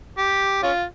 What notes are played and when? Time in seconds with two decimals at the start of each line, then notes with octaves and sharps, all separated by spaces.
0.18 G4
0.63 C#4 F4